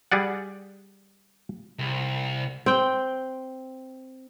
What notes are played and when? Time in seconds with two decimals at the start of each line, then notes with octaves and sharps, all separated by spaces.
0.12 G3 G#4 D5 F#5
1.79 C2
2.66 C4 G5